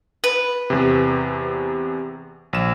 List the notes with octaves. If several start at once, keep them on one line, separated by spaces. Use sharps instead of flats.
B4
E2 C3
A#1 E7